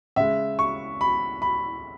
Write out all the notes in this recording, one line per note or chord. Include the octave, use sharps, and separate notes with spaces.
C#3 G#3 E5
C#6
B5
B5